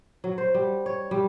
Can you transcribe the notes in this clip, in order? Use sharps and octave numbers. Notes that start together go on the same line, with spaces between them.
F#3
C5
G3
C#5
G3